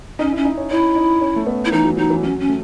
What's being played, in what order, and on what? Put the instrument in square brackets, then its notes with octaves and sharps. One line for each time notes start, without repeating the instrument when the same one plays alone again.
[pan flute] C#4 [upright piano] D#4
[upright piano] E4
[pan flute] C#4
[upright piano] D#4
C#4
[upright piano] C#4 [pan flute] E4
[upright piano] D#4
C#4
A3
B3
[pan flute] E4
[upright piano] E3 [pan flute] D#4
[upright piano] F#3
[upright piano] F#3 [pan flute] D#4
[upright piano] E3
[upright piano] F#3 [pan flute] C#4
[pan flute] C#4
[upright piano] A3